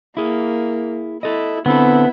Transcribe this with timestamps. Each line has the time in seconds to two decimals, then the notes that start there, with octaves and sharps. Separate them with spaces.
0.17 A#3 E4 G#4
1.23 E4 A4 D#5
1.66 D3 B3 C4 E4 A4